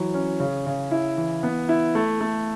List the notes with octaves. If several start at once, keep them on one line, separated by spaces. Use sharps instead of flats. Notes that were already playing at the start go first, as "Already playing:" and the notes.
Already playing: E3 F#3
C#4
C#3
C#3
E4
E3
B3
E4
A3
A3